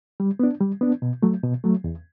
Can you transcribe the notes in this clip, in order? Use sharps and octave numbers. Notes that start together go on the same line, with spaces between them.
G3
B3 D4
G3
B3 D4
B2
F#3 A3
B2
F#3 A3
E2